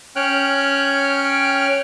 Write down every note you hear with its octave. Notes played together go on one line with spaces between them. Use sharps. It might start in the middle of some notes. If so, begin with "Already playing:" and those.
C#4 C#5 G5 F6 F#6